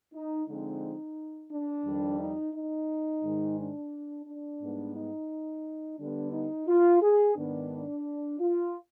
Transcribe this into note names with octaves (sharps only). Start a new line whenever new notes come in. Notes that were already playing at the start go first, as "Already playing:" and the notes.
D#4
D3 F3 G#3 C4 D#4
D4
F2 D#3 G3
D#4
D#4
G#2 D#3 G#3
D4
D4
G#2 G3 B3
D#4
D3 G3 B3 D4
D#4
F4
G#4
G#2 D#3 B3 D4
F4